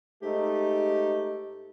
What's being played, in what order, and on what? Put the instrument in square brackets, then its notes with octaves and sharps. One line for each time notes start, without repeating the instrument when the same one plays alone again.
[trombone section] G#2 A3 D#4 [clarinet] G4